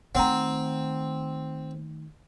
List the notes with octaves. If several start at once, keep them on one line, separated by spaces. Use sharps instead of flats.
D#3 A3 C4 F#5 A#5